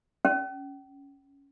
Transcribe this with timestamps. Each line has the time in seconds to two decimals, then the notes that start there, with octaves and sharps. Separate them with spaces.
0.25 C#4